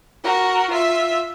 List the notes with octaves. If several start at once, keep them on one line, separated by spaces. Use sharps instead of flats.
F#4 A#4
F4 E5